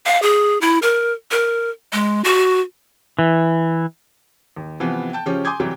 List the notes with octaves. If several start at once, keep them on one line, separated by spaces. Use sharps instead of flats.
F5
G#4
E4
A#4
A#4
G#3
F#4
E3
D#2
C3 E3 F3 B3
G5 A5 G6
C#3 F3 C#4 G4
G#5 C6 D6 D#6 G6 G#6
C3 E3 F#3 G3 G4